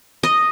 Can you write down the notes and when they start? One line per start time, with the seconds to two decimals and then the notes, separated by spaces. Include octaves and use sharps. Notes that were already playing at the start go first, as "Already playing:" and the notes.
0.23 D#5